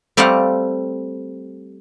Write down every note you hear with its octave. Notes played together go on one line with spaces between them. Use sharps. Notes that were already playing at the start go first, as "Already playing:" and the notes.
G3 A3 C4 G4 F5 F#5